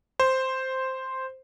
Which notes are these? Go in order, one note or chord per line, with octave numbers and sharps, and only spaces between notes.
C5